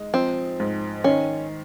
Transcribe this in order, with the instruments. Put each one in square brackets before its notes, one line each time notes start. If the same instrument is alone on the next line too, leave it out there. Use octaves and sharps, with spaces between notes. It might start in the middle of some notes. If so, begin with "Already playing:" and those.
Already playing: [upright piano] G#3 D#4
[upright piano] F3 [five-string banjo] C4
[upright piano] G#2
[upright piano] D#3 [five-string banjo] C#4